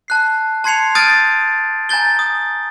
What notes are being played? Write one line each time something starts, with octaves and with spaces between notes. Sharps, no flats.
A5 F#6 C7
A5 C6 G#6 C7 C#7 F7
D#6 F6 G6 A6 D7 D#7
G#5 A#5 G6 A6 G7
D#6